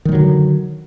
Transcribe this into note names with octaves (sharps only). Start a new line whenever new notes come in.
D3 D#3 F#3 G3